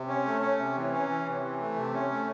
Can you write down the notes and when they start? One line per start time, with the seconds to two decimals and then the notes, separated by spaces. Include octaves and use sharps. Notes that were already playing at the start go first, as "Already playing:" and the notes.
Already playing: C3
0.08 C#4
0.25 A3
0.41 C#4
0.59 C3
0.76 E3
0.92 C#4
1.09 E3
1.26 C3
1.43 E3
1.61 A3
1.76 C3
1.94 C#4
2.11 A3